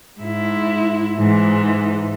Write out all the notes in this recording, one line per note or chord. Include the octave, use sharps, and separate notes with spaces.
G#2 E4
G#2 E3